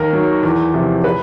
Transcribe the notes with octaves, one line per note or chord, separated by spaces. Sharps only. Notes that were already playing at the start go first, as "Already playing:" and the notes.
Already playing: D#2 A#4
D#3 F#3
E2
C3 F3
B4